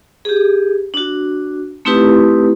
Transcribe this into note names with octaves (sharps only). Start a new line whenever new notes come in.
G4 G#4
D4 F#4
A3 C4 D#4 E4 G4 B4